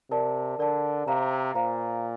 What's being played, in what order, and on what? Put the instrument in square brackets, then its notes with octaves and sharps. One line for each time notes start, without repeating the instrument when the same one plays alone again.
[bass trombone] C3 [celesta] A#4 D5 A5
[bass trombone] D3 [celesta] A#4 D5 A5
[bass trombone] C3 [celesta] C5 F5 A#5
[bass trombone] A#2 [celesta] C5 F5 A#5